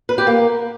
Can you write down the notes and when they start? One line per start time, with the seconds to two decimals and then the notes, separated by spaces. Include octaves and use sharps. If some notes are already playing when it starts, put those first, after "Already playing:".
0.09 B4
0.18 G4
0.27 A#3